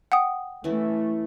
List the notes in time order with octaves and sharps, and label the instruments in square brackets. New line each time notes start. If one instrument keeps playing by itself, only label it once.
[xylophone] F#5 G5 D#6
[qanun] E3 C#4 E4 [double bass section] A3